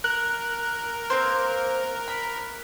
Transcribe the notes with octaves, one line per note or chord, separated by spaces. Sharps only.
A#4 F#6
A#3 C4 C5
B5